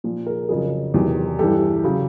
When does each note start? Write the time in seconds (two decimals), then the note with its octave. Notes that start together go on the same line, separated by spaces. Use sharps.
0.04 A#2 F3
0.26 G#4 A#4
0.49 F2 C#3 F#3 G#4 A#4
0.94 E2 C3 D#3 F#3
1.39 G2 E3 G4 A4
1.84 C#3 F#3